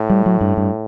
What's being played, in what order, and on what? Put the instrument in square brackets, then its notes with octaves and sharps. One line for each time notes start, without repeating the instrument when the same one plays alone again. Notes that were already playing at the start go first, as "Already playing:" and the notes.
Already playing: [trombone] A2
[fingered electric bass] G3
F#3
G2
G2